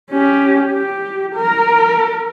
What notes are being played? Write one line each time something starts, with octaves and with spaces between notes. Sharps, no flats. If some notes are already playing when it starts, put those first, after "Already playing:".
C#4 G4
G4
A#4